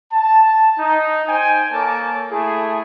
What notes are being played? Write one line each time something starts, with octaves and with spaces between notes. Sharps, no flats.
A5
D#4
C5 G5 G#5
A#3 A4 C#5 A5 D6
A3 E4 G#4